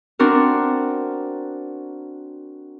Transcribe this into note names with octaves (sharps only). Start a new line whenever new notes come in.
C4 D4 F#4 A#4